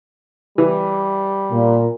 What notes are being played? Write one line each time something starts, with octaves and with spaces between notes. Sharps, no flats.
E3 G3
A#2